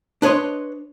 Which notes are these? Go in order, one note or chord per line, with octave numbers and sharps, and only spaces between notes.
D4 B4 C#5 D#5 C6